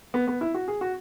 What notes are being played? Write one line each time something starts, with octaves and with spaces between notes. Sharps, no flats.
B3
B3
E4
F#4
G#4
F#4